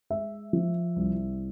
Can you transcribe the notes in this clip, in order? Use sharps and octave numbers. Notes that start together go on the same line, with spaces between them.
G#3 E5
F3
C2